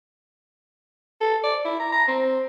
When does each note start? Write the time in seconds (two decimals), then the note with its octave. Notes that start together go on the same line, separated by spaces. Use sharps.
1.21 A4
1.44 D5
1.65 E4
1.80 A#5
1.92 A#5
2.08 C4